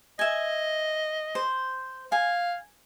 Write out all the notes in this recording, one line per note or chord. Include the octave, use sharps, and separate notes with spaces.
D#5 E5 G#5
C5
F5 G#5